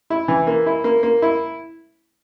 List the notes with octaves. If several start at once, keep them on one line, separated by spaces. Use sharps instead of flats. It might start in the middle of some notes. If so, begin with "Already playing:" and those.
E4
E3
A#3
E4
A#3
A#3
E4